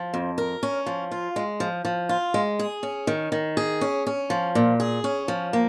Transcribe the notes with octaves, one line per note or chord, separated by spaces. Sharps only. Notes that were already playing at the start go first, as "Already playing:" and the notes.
Already playing: F3
F2
A#4
C#4
F3
F4
G#3
F3
F3
F4
G#3
G#4
C#4
D#3
D#3
G#4
C#4
C#4
F3
A#2
G#4
C#4
F3
A#3